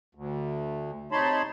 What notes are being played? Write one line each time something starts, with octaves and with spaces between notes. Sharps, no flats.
D2
C3 D#4 C#5 A5 B5 C6